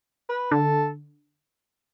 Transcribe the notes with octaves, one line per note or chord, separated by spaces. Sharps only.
B4
D3 A4